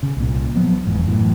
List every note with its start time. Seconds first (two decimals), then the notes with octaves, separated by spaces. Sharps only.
0.03 C#3
0.17 C2 A#2
0.56 F3 F#3 B3
0.87 F1 E2 G#2
1.08 F#2 A2 E3